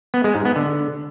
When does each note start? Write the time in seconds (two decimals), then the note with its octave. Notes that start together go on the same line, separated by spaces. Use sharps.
0.14 B3
0.24 G#3
0.35 G#2
0.45 B3
0.56 D3